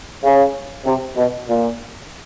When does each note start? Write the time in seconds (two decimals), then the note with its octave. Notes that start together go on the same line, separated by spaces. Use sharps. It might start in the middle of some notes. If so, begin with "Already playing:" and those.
0.24 C#3
0.85 C3
1.16 B2
1.48 A#2